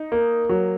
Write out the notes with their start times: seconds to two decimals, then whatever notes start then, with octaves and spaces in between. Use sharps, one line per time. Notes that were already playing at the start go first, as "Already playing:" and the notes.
Already playing: D#4
0.12 A#3
0.49 F#3